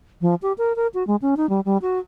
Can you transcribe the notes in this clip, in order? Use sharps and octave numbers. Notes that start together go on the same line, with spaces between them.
F3
G4
A#4
A#4
F#4
G#3
C#4
D#4
G3
G3
F#4